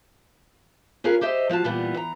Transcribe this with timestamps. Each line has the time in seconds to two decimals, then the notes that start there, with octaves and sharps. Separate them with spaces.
1.04 C#4 F4 G#4 A#4 B4 C#5
1.21 G4 C5 D#5 E5
1.49 F3 F4 F#4 A5
1.64 A#2 E3 G3 B3
1.94 E3 A#5